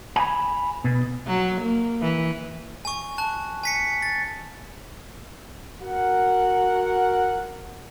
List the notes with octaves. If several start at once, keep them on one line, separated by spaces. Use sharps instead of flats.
G#5 B5
B2
F#3
A#3
E3
G#5 C#6
A5 F#6
G#5 B6 C#7
A6
F#4 A#4 F#5